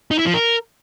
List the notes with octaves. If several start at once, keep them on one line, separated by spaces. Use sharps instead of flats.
D#4
E4
F3
A#4